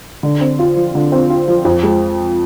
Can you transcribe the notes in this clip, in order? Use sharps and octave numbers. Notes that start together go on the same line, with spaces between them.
D3
C4
F4
F3
D3
C4
F4
F3
F2
G#3